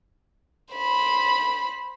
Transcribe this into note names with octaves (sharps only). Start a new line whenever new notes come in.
C5 B5